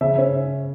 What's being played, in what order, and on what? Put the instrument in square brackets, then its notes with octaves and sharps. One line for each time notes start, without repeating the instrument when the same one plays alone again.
[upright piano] C#3 [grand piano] E5
[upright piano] C#4